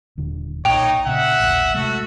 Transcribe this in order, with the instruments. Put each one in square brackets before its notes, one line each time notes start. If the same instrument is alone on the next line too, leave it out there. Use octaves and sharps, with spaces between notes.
[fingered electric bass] D#1 D3
[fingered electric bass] B1 A#2 [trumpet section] D#4 C#5 [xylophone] G5 F7
[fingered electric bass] A#2 C#3 [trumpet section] E5 F#5
[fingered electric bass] D#1 A1
[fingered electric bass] C3 G#3 A3 [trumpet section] F#4 A4